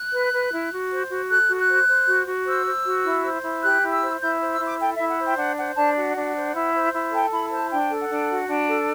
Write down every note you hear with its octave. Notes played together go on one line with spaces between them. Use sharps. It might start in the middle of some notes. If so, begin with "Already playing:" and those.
Already playing: F#6
B4
B4
E4
F#4
C5
F#4
A4 F#6
F#4
F#6
C5
C5
F#4
F#4
C5 E6
C5
F#4
E4
C5
E4
G4 F#6
E4
E6
C5
E4 G6
C5
E6
E4 D6
A4 G5
E4 E5
F#5
C5
G5
D4 F#5
C5 F#5
D4 A5
F#4 F#5
D4
C5
E4
C5
E4
A4 G5
E4 B5
C5 A5
D4 G5
A4
F#5
D4
F#4
D4
A4